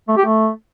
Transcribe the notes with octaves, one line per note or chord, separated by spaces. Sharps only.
A3
G4
A3